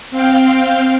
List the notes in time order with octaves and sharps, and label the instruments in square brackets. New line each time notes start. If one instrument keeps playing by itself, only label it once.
[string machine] C4 F5 G5